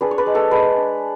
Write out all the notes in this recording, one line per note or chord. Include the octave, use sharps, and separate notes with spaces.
D4 G#4 B4
C#5
B4 D5
G#3
A4 C#5
G#3 G#4 B4
D4